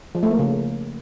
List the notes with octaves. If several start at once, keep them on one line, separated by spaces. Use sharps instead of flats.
F3
A3
A#3
C#3